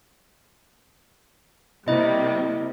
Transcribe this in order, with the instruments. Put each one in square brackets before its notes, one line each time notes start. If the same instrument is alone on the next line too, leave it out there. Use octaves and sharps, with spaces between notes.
[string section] C3 G3 A#3 [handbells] E4 D#5